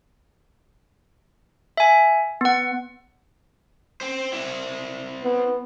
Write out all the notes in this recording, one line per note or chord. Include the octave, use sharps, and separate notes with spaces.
E5 G#5
B3 F#5
C5 G5
C4 E4
B3